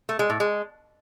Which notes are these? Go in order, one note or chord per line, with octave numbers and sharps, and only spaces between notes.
A3
G#3
A2
G#3